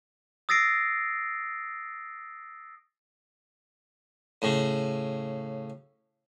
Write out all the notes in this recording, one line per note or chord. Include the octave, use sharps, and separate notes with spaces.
D#6 E6 A6 A#6 C7 D7
A2 C#3